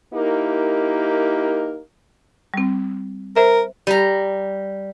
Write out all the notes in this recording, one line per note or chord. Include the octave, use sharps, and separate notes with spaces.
A#3 D#4 E4 G4 A#4
G3 C4
A#4 C5 E5
G3 A#5